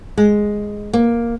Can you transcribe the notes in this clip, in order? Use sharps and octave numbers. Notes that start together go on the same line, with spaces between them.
G#3
A#3